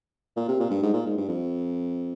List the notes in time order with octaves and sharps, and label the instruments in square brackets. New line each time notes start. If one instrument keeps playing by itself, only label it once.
[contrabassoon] A#2
C3
A#2
G2
G#2
A#2
G#2
G2
F2